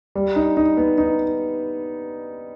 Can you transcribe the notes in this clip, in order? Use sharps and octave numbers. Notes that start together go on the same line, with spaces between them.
G3
D#4
D#4
B3
D#4